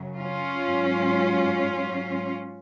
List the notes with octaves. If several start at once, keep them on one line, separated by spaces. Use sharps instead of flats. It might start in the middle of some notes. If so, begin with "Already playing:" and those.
Already playing: F#2 C#3 F#3
C#4 F4
G#2 F#3